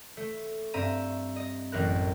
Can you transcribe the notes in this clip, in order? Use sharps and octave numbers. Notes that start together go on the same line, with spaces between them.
A3
G2 C4 E5 A#5 D#7
D#5
A1 F#2 A#4 F#6